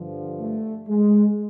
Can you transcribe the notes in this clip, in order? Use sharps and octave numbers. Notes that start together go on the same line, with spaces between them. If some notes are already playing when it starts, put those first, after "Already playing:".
Already playing: G2 D3 F3
A3
G#3